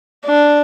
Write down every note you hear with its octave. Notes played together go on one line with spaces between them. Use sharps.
D4